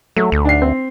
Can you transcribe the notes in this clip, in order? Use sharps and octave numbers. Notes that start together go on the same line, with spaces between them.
F#3 A3
D2
D4 C7
C4